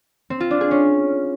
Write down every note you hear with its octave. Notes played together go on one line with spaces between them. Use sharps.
C4
F4
D4
G#4
C#4